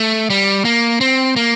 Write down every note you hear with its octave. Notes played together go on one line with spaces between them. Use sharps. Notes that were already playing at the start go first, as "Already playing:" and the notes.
Already playing: A3
G3
A#3
C4
A#3